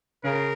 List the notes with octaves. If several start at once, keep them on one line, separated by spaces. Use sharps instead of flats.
C#3 A#4